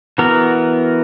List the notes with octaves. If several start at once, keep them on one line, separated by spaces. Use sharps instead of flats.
E3 B3 F#4 A#4